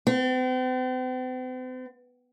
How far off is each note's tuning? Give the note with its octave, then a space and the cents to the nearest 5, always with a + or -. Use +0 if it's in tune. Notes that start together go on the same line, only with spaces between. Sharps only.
C4 -45